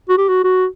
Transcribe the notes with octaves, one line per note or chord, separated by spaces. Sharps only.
F#4
G4
F#4
F#4